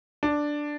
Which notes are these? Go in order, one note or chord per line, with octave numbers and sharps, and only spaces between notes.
D4